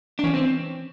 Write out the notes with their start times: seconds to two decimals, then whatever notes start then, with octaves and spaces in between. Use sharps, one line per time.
0.19 D4
0.24 E3 C#4
0.34 C4